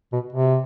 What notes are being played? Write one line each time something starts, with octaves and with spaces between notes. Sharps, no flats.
B2
C3